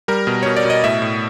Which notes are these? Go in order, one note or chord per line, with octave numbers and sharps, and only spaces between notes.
G3 A#4
B2
B2 C#5
D5
B2 D#5
A2 E5
A2